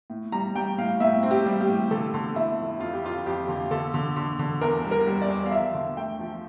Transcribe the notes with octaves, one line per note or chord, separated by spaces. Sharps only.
A2
G3 A#5
G3 G5
A2 F5
A2 E5
C4
G4
G3
G4
A2
D3 A4
D3
D3 E4
F2
F2 F4
G4
F2 F4
F2 G4
D3
D3 A4
D3
D3
D3
E2 A#4
G3
A#4
G3
D5
E2
F5
F3 E5
D3
A3 G5
F3